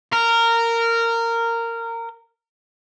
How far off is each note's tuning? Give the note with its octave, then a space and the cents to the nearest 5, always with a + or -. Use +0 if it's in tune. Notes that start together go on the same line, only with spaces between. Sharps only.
A#4 -15